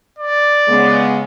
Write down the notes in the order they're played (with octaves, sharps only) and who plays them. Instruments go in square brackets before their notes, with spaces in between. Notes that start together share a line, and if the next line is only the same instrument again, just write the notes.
[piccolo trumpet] D5
[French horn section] C#3 G#3 B3